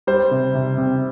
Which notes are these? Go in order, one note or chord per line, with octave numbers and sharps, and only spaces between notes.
G3 C5
C3
C3
C3